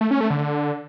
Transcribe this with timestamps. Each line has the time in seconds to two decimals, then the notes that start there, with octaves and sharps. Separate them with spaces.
0.01 A3
0.11 C#4
0.21 A3
0.30 D3